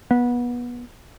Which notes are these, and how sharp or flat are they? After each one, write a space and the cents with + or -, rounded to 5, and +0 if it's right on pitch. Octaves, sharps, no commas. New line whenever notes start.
B3 -25